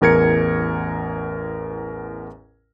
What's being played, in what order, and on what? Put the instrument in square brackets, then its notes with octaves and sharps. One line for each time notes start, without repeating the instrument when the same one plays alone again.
[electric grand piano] A1 E2 A#4 G#6 C#7